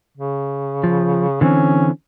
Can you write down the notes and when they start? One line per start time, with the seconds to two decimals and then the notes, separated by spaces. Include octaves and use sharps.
0.17 C#3
0.84 F3
1.41 D3 E3 C4 C#4